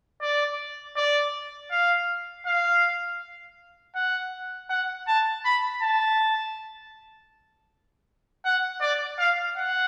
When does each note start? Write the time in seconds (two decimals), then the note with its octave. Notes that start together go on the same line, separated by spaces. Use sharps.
0.21 D5
0.96 D5
1.71 F5
2.46 F5
3.95 F#5
4.69 F#5
5.07 A5
5.45 B5
5.82 A5
8.45 F#5
8.81 D5
9.19 F5
9.57 F#5